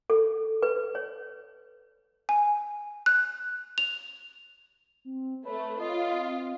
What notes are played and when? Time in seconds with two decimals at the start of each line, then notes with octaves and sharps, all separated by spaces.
0.10 A4
0.63 B4
0.95 C#5
2.29 G#5
3.06 F#6
3.78 F7
5.05 C4
5.45 A3 B4 C#5
5.80 F4 D#5
6.11 C4